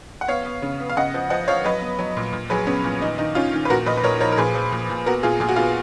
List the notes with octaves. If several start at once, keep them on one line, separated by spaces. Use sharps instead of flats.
F#5
B3 C#5 F5
B3
C#3
B3
F5
C#3 D#5 F#5
F3
F3 D#5 F#5
F3 C#5 F5
F#3 B4 D#5
B3
F#3
A#2
A#2
F#3 G#4 B4
B3 C#4
A#2
D#3 D#4
D#3 D#4
D#3 C#4 F4
D#3
B4
A#2 F#4 A#4
A#2 B4 D#5
B4
A#2 A#4 C#5
F3 A#4 C#5
A#4
A#2 G#4 B4
F3
A#2
A#2
B3 F#4 A#4
A#2 F4 G#4
A#2 G#4
F#4
B3 F4 G#4